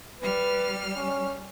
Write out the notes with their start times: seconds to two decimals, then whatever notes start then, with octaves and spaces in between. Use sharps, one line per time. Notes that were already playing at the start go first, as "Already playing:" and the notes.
0.21 G3 B4 F6
0.96 C#4